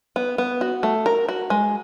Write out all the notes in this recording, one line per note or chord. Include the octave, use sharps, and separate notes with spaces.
B3
B3
F#4
A3
A#4
F#4
G#3